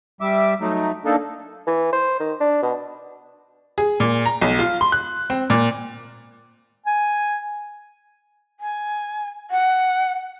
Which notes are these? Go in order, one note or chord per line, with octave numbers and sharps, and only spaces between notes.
G3 E5 D6
F#3 A3 D#4
A#3 D4 D#4 A4
E3
C5
D#3
D4
B2
G#4
A#2
A#5
B1
F4
C6
F#6
C4
A#2
G#5
G#5
F#5